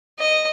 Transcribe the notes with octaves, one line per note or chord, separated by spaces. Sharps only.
D#5